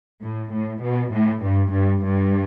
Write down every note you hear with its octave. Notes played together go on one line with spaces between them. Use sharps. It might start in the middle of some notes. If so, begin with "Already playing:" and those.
A2
A2
B2
A2
G2
G2
G2